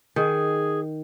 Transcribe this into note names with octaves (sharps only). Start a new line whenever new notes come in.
D#3 G#4